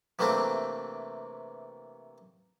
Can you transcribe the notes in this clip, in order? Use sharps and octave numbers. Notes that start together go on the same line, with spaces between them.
C3 E3 A3 A#3 C4 D4